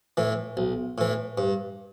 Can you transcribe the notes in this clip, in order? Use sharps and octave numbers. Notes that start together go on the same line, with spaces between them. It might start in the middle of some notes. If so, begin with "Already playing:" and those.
A2 E3
B1
A2 E3
G2